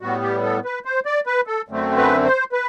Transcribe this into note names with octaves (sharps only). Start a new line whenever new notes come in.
A2 G3 B3 F#4
G4
A4
B4
C5
D5
B4
A4
F#2 D3 A3 C4
B4
C5
B4